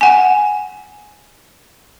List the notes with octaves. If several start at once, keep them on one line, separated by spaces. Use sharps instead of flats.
F#5 G#5